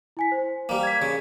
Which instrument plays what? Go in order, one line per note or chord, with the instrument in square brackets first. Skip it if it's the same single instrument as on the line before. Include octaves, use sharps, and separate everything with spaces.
[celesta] E4 G#5 B6
C5
[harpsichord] G3 A#3
[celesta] G#6 B6
[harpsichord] C#3